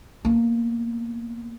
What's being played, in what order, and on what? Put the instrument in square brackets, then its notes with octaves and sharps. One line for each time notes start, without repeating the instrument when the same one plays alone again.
[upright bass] A#3 B3